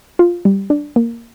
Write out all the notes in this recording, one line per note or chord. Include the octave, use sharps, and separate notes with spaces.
F4
G3
D4
A#3